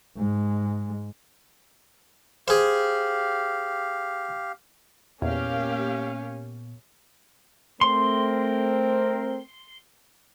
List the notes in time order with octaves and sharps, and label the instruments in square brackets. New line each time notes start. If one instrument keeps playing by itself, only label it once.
[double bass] G#2 G#3
[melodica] G4 F5 [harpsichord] G#4 C5
[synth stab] E2 [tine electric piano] A#2 B3 [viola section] A#3 G4 F5 [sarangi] C#4
[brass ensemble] A3 C4 A#4 [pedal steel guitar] C6